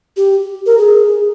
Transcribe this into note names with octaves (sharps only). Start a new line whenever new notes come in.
G4
A#4
G#4